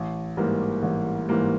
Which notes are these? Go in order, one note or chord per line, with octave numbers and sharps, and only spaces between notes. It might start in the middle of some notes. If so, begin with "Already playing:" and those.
Already playing: A1
G#2 E3 G3 A#3
A1
G#2 E3 G3 A#3